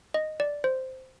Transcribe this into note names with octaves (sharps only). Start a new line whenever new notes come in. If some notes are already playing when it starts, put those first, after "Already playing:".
D#5
D5
C5